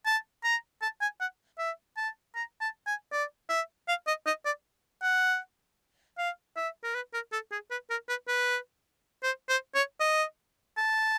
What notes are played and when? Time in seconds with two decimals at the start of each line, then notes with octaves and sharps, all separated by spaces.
0.05 A5
0.44 A#5
0.82 A5
1.01 G#5
1.20 F#5
1.59 E5
1.97 A5
2.35 A#5
2.61 A5
2.87 G#5
3.12 D5
3.49 E5
3.88 F5
4.07 D#5
4.27 D#5
4.45 D5
5.02 F#5
6.18 F5
6.56 E5
6.84 A#4
6.95 B4
7.14 A#4
7.32 A4
7.52 G#4
7.71 B4
7.90 A#4
8.09 B4
8.28 B4
9.23 C5
9.49 C5
9.75 C#5
10.00 D#5
10.77 A5